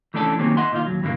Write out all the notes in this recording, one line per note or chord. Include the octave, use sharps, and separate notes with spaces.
E3 A3 C#4 D4 G#4 A4
D#3 F#3 G3 A#3 C4 C#4
D#5 E5 F#5 C6
A#2 D#3 F4
D#2 F#3
G2 B2 D3 E3 G#3 A#3